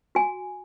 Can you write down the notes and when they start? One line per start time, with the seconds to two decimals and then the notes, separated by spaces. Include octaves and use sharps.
0.15 F#4 G#5